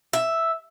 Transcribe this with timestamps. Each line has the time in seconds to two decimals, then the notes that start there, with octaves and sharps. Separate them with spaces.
0.13 E5